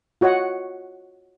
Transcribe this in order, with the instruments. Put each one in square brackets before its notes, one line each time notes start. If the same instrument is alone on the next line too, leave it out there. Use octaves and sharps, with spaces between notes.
[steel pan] F4 F#4 C#5 D#5 F#5